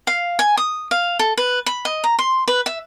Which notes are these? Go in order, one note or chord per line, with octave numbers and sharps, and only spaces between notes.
F5
G#5
D#6
F5
A4
B4
B5
D#5
A#5
C6
B4
E5